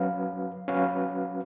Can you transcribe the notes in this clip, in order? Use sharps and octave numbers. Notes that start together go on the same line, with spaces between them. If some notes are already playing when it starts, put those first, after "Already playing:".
Already playing: F#3 C#4 F#4 B4 F5
F#3 C#4 F#4 B4 F5